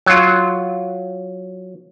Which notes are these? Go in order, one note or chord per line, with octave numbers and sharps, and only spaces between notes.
F#3 F4